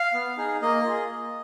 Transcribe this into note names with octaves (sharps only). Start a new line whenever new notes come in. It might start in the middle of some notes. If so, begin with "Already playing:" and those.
Already playing: F5
B3
D#4 G#4
A#3 D#5
F4 G#4
A#3